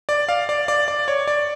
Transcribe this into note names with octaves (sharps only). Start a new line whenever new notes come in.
D5
F5
D5
D5
D5
C#5
D5